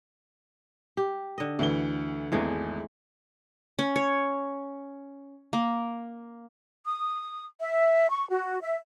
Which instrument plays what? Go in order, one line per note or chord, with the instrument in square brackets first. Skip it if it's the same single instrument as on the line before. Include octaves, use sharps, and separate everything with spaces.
[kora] G4
D3 D#5
[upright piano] D2 E3 G7
[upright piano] G#1 E2 [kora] E3 G#3 A3
[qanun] C#4
C#5
A#3
[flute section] D#6
E5
C#6
F#4
E5